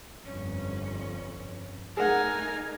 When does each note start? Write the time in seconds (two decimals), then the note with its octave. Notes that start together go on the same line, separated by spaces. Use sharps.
0.25 G1 F2 C#4
1.97 A3 D#4 G#4 A#4 F#5 G#5